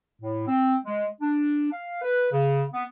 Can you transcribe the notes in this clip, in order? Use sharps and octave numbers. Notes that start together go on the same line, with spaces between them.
A2
C4
G#3
D4
F5
B4
C#3
B3